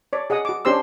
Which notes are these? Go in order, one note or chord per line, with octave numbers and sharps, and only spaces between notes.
C#5 D5
G#4 D#5 F#5 D#6
F#4 D6
C#4 D4 G4 C5 C6 E6